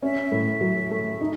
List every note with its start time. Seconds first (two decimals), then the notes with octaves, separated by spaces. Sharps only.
0.02 C#4 E5
0.32 A2
0.61 F#3
0.91 A3
1.21 D#4